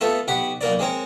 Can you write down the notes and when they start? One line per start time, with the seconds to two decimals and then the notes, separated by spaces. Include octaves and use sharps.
0.01 A3 B3 F4 A4
0.28 B1 G4 F#5 B5
0.61 B1 A#3 A#4 D5
0.79 G#3 C4 A#4 C#5